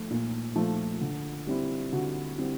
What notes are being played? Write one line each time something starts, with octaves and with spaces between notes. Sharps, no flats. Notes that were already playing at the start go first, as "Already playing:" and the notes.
Already playing: F3 A3
A#2
F3 A3
D3
G3 C4 E4
D3 F#4
G3 C4 E4